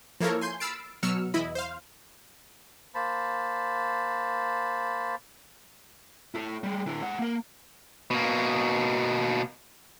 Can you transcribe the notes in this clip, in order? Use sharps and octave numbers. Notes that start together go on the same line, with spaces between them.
F3 A#3 E4 A4 A#4 C#5
G#5 C6 G6
B5 E6 F6 A6 C7 D7
B2 F#3 E6 F6 C#7
E2 E4 D#5 B5
C5 F5
A#3 C5 A5 B5
E4 A4
G3 G#3
D3 E4
G#3 F#5
A#3 A#4
B2 A#3